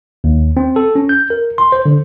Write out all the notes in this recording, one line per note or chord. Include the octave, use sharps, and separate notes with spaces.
D#2
C4
A4
C#4
G6
A#4
C6
C5
D3